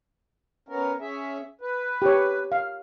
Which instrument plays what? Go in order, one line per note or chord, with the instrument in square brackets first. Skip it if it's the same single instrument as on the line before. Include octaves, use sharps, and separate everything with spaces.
[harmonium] B3 C#4 A#4
C#4 G#4 E5
B4
[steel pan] G4 C#5
F5